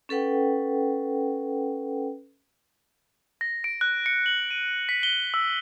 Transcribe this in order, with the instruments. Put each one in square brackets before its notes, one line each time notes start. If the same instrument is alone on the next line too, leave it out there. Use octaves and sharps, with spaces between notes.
[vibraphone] C#4 A4 B4 F#5 G5
[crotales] A#6
D7
F#6
C#7
F#7
D#7
B6
G7
E6